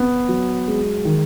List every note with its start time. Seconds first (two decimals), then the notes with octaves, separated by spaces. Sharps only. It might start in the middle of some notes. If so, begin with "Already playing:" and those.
Already playing: B3
0.28 F#3
0.67 G#3
1.05 D#3